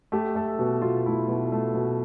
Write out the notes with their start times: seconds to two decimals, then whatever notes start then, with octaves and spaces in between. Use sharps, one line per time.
0.12 A3 G4
0.35 A3 A4
0.59 B2
0.82 B2 F4
1.06 A3 E4
1.28 B2
1.52 A3
1.75 B2